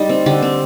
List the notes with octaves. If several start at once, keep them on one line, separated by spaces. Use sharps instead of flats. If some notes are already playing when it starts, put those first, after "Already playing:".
Already playing: G3 D#4
C4
D3 G4
C4